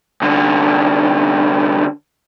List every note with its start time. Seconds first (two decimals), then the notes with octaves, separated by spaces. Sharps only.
0.22 C2 D3